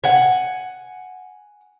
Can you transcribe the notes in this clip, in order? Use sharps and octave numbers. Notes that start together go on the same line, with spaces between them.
F#5 G#5